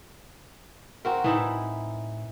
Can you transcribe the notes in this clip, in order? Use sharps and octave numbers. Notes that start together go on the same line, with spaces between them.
C4 F#4 A#4
A2 E3 D#4 E4